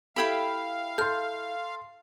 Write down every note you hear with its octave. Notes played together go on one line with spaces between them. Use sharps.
E4 G4 A4 F5 G5 B5 G#6
A4 C6 F6 G6